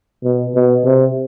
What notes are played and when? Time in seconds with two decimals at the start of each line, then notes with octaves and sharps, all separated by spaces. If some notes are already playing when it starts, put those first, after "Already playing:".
0.24 B2
0.55 B2
0.85 C3